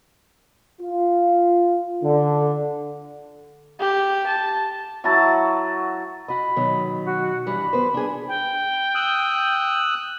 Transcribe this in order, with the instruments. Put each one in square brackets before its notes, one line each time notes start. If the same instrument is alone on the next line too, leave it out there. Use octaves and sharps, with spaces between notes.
[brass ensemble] F4
D3
[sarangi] G4
A5
[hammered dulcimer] F#3 E4 F#4 A5
[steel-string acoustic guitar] F#4 D#5 [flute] B5
[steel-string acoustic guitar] B2 D#3 F#3
[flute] F#4
[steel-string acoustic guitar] G2 E3 G3 [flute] B5
[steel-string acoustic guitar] B3 B4 C5
D4 G#4
[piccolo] G5
[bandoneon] D#6 E6 F#6